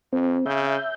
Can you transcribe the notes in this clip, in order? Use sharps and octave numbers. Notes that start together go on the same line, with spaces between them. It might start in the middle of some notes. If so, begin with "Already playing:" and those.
F2 C4
C#3 E5 G6